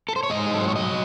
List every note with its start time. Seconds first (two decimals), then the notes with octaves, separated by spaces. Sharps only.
0.09 A4
0.16 C5
0.23 C#5
0.30 G#2 D#5
0.46 G#4
0.54 F#3 A4
0.61 C5
0.68 C#5
0.76 F#3 D#5